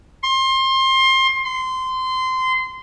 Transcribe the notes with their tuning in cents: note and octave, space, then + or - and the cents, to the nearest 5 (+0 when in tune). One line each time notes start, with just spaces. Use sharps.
C6 +25
C6 -20